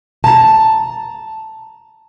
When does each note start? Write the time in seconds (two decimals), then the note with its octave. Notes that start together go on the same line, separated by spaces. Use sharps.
0.24 A5 A#5